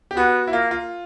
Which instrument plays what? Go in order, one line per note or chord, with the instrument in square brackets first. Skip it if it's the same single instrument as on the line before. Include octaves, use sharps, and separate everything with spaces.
[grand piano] G4
[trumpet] B3 [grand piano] F#4
[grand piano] E4
[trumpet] A#3 [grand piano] F4
[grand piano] F4